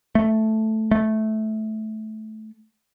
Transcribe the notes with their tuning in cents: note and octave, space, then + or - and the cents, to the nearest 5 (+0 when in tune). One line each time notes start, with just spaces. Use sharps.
A3 +0
A3 -15